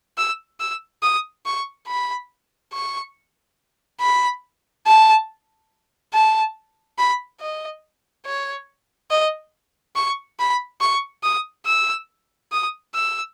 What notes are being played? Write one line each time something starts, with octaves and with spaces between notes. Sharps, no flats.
E6
E6
D#6
C#6
B5
C#6
B5
A5
A5
B5
D#5
C#5
D#5
C#6
B5
C#6
D#6
E6
D#6
E6